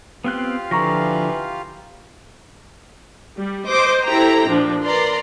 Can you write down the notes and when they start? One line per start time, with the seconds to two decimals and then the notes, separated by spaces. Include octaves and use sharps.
0.24 B3 C4 F4 G4 F5 F#6
0.71 D3 E3 F3 A#5 C#6 A#6
3.36 G3
3.69 C5 D#5 D6
4.05 E4 G4 A4 C5 G5 A#5
4.49 A#2 F3 D4
4.84 A#4 B4 D5 A#5 C6